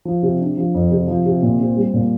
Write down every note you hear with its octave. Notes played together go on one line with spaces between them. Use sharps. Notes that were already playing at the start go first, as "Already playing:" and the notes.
F3
C3
D4
F3
F2
C3
F3
C3
A#2
C4
G3
A#2